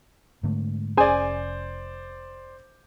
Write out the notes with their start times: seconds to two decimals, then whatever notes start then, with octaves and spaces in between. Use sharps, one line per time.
0.43 G#2 D3 A3
0.97 F1 C#4 G#4 C5 D5 G#5